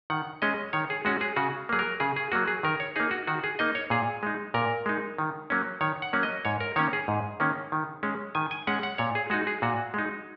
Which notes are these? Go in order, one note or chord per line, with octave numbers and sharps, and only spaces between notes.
D#3 F#5
G#3 C#4 D#5
D#3 C#5
G#4
G#3 C#4 F#4
G#4
C#3 F#4
F#3 A#3 G#4
A#4
C#3 G#4
G#4
F#3 A#3 F#4
G#4
D#3 A#4
C#5
A#3 D#4 G#4
F#4
D#3 F#4
G#4
A#3 D#4 D#5
C#5
A#2 G#4
G#3 D#4
A#2 A#4
G#3 D#4
D#3
F#3 A#3 C#4
D#3 C#5
F#5
F#3 A#3 C#4
D#5
G#2 C#5
A#4
D#3 A#3 C#4 C#5
G#4
G#2
D#3 A#3 C#4
D#3
G#3 C#4
D#3 G#5
G#5
G#3 C#4 F#5
F#5
A#2 C#5
G#4
G#3 D#4 F#4
G#4
A#2 F#4
G#3 D#4